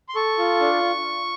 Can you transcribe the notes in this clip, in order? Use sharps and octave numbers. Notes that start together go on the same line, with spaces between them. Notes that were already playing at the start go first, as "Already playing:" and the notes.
C6
A4 C#6
F4
D4